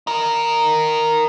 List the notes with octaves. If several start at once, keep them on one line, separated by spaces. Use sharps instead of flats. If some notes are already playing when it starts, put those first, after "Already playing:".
D#4 A#4